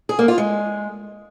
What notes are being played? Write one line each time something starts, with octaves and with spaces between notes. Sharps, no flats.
G#4
A#3
F4
G#3